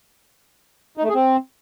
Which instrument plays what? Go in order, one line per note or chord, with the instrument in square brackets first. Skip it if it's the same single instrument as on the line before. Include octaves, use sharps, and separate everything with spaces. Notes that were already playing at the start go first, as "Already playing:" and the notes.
[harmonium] D#4
A3
G#4
C4